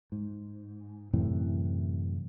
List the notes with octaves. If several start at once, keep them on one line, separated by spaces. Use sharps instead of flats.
G#2
F#2 A2 C3 E3